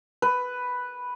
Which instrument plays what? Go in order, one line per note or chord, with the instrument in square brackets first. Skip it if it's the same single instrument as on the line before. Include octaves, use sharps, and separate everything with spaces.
[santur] B4